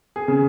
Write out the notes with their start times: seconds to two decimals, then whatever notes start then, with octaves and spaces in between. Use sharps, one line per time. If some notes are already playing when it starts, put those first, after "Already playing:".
0.16 G#4
0.28 C#3